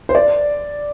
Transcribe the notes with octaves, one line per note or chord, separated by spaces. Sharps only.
C5
D5